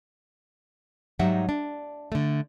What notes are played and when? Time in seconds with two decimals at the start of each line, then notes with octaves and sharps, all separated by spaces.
1.19 G#2 F#3 G3 D#4 E5 F#5
1.49 D4
2.12 D3 A3